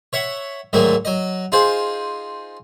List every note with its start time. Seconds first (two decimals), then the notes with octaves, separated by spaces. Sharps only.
0.13 C#5 E5 F#5
0.73 D2 G#2 D#3 F#3 A3 A#3
1.05 F#3 D#5
1.52 D#4 F4 G#4 C5